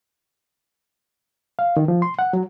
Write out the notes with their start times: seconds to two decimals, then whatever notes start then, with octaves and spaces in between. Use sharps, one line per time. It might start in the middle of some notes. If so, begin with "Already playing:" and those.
1.59 F5
1.77 D#3
1.88 F3
2.02 C6
2.19 F#5
2.33 F#3